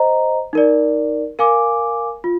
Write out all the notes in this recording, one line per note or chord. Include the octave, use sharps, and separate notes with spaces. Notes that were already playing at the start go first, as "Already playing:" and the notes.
Already playing: C5 D#5 A#5
D#4 A#4 D5
A#4 F5 G#5 D6
F4